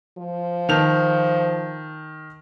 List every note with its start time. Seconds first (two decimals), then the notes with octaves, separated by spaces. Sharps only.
0.18 F3
0.69 D#3 A5 F7